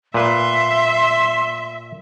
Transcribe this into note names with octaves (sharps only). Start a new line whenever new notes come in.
A#2 B4 E5 C6